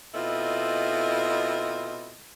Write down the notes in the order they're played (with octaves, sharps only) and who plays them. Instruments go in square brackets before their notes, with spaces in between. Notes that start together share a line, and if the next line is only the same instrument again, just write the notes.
[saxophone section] B2 C4 E4 F4 A4 D#5